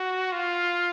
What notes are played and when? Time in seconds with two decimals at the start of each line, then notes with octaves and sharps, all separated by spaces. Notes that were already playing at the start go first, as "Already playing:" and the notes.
Already playing: F#4
0.32 F4